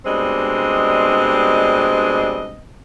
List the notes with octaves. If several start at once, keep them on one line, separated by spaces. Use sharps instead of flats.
B2 G3 G#3 C4 D4 D#5